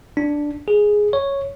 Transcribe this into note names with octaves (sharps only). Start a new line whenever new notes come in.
D4
G#4
C#5